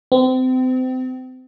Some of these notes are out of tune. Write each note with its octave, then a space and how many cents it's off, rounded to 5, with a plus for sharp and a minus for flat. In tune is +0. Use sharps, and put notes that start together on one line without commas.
C4 -30